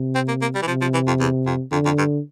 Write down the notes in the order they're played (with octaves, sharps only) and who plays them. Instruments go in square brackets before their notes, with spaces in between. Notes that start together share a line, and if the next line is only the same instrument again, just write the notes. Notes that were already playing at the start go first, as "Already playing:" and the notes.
Already playing: [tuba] C3
[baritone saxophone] C4
A#3
A#3
G3
E3
[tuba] C3 [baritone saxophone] F3
[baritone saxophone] F3
E3
F2
E2
F2
[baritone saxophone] F2 [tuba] D3
[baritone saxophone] F2
G2